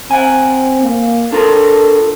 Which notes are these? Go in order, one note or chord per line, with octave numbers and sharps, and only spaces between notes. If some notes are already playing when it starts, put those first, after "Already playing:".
C4 F#5 G#5
A#3
D4 F4 A4 A#4